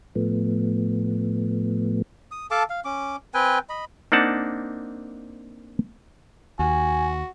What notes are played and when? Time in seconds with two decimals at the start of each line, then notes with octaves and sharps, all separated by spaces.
0.16 A2 F3 A3 B3
2.31 D#6
2.51 A4 F5 A5 D6
2.70 F5
2.85 C#4 D6
3.34 C4 B4 G5 G#5
3.69 D#5 B5
4.12 A#3 C4 D4 D#4 F#5 A5
6.59 D#2 F#4 G#5